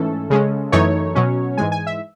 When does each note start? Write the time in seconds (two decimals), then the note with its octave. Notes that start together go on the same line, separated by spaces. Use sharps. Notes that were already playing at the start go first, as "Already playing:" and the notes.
Already playing: G#2 E3 A3 C#4 A4
0.30 C#3 G#3 C#4
0.72 F#2 E3 A3 D#4 C#5
1.15 B2 F#3 C#4
1.57 G#2 E3 G#3 G#5
1.72 G#5
1.87 E5